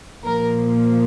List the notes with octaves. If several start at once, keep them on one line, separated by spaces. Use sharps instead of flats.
A#2 F3 A#3 A#4